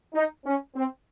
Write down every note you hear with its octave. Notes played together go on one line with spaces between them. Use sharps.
D#4
C#4
C4